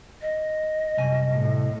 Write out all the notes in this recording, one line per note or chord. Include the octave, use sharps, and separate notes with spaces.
D#5
C2 F#2 G#5
A2